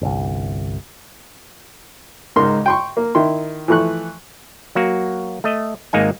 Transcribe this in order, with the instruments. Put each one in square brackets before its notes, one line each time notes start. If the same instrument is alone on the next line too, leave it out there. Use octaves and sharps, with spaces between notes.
[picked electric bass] G1 C2
[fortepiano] C#2 G#2 A#4 C6
G5 C6 C#6
A#3
D#3 E4 C6
E3 F3 A3 C#6 F#6
[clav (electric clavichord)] F#3 A#3 F#4
A3 D#5
G#1 G#3 A#3 D#4 G#5